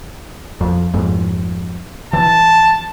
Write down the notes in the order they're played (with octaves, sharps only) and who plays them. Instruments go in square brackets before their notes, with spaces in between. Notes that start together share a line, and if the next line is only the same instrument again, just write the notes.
[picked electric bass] F2
F2 G#2
[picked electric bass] E3 [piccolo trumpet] A5